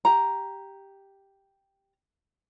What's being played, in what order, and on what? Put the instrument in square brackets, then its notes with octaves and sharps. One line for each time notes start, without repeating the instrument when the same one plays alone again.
[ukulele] G4 A#5